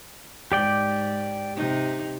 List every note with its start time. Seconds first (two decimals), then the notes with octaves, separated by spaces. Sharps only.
0.52 G#2 G4 D5 G5
1.56 C3 D#4